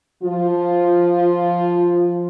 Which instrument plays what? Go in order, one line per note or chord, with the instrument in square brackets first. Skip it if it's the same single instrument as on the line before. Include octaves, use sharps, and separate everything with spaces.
[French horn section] F3 F4